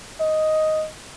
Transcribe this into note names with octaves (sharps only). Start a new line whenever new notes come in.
D#5